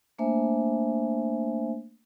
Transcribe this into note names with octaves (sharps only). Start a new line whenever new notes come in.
A3 A#3 D4 C5 E5 G#5